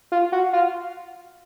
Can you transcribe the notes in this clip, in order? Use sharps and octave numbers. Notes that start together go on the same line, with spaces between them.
F4
F#4
F4